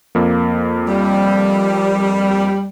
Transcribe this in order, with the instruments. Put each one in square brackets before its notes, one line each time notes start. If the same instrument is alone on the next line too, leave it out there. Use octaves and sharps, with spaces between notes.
[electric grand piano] F2 A#3
[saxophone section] G3